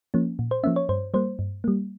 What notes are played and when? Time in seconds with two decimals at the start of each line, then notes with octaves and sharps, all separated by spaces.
0.14 F3 A#3 C#4
0.39 A#2
0.51 C5
0.64 F3 A#3 C#4 E5
0.76 C#5
0.89 G2 C5
1.14 G3 A#3 C5
1.39 G2
1.64 G3 A#3